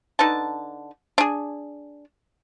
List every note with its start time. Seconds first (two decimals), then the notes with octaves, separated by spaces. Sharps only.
0.19 D3 D#4 B4 A5
1.18 D4 G#4